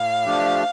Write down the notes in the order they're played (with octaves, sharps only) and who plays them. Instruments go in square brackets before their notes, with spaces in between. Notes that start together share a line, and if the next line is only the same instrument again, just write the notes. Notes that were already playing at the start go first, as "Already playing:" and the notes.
Already playing: [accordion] A2 [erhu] F5
[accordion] F3 A3 D4 G4